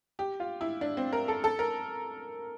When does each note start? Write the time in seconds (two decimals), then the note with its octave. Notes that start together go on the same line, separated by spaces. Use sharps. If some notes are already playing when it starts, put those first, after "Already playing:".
0.19 G4
0.40 F4
0.61 E4
0.81 D4
0.97 C4
1.13 A#4
1.28 A4
1.44 A4
1.59 A#4